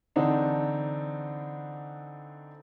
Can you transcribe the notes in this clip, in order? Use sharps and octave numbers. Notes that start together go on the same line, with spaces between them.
D3 E3 C4 D4 D#4